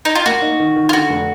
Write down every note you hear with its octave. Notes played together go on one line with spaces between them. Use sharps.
D#4
F4
A#3 F#4
D#4
D#3
D#3
F4
D3 F#4
F1